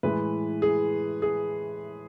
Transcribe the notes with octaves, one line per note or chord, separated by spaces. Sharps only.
A2 E3 G#3 B4
G#4
G#4